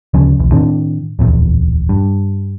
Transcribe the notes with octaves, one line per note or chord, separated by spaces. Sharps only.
D2 C#3 F3 C#4
B1 E2
A2 D#3 C4 D4
D1 A#1 E2
G2